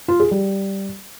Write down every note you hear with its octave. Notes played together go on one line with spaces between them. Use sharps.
F4
G#4
G3